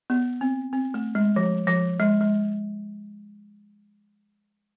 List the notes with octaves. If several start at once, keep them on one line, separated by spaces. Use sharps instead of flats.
B3
C4
C4
A3
G#3
F3
F3
G#3
G#3